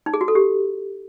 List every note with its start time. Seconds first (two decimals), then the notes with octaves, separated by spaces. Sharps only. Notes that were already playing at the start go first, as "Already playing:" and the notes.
0.06 D#4
0.14 G#4
0.21 F#4
0.28 A4
0.35 G4